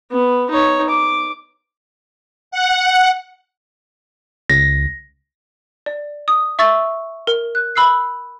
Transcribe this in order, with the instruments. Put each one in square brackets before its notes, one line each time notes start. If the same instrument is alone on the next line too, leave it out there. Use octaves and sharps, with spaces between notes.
[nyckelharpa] B3
D#4 C#5
D6
[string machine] F#5
[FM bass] C#2 [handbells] A#6
[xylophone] D5
D#6
E5 C#6 E6 A6
A#4
F#6
B5 E6 F#6 C7